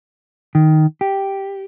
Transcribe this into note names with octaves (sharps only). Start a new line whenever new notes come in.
D#3
G4